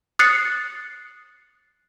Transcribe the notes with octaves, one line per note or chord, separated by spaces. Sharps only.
D#6 F#6 A6 C7 C#7